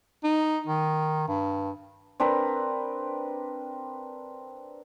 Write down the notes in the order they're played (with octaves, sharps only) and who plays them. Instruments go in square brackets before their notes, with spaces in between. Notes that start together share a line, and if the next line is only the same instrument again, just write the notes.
[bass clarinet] D#4
D#3
G2
[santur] C4 D4 A#4 B4